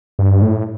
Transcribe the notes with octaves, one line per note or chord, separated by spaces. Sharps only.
G2
A2